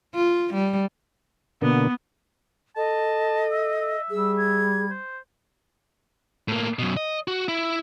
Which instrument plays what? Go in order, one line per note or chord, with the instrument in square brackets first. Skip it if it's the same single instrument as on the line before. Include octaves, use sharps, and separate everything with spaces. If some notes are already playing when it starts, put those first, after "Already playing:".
[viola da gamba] F4
G3
[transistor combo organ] B2 D3 A#3 [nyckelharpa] B3
[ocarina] A4 [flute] D#5 [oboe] A5
[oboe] E5
E5
[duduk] G3 [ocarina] G#4 [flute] E6
[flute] G#6
[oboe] C5
[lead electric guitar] A2 A#3
F#2 B2
D#5
F#4
E4